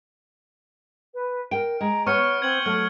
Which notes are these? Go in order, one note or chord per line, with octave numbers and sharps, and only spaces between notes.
B4
A#4 G5 D7
G#3 A#5
B3 C#5 C#6 F6 C#7
C4 G#6 F#7 G7
F#3 A3 F6